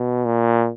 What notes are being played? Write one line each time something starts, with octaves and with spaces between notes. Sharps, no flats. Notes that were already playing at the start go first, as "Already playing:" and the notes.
Already playing: B2
A#2